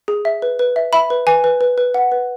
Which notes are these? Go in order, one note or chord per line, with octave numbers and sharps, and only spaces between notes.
G#4
E5
B4
B4
E5
E5 B5
B4
B4 G#5
B4
B4
B4
F#5
B4